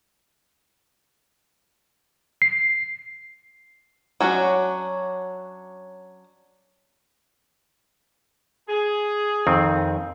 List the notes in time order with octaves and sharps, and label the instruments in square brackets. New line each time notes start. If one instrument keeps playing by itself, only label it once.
[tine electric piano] C7
[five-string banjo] F#3 C#4 D4 F#4
[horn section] G#4
[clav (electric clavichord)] F2 D#3 C4